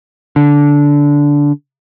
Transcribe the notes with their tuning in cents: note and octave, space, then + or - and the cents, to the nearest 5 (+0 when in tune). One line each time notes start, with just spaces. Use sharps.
D3 -15